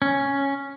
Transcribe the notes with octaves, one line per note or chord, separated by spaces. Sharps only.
C#4